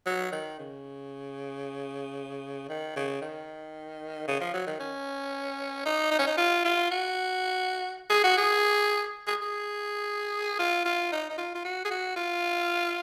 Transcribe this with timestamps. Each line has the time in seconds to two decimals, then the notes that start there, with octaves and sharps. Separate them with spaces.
0.07 F#3
0.32 D#3
0.59 C#3
2.69 D#3
2.96 C#3
3.22 D#3
4.28 C#3
4.41 F3
4.54 F#3
4.67 D#3
4.80 C#4
5.86 D#4
6.11 D#4
6.19 C#4
6.27 D#4
6.38 F4
6.65 F4
6.91 F#4
8.10 G#4
8.24 F#4
8.37 G#4
9.27 G#4
9.42 G#4
10.59 F4
10.86 F4
11.12 D#4
11.30 D#4
11.38 F4
11.55 F4
11.65 F#4
11.85 G#4
11.91 F#4
12.16 F4